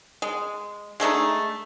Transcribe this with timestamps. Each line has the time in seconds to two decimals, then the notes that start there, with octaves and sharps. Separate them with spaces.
0.22 G#3
1.00 G#3 A3 D4 D#4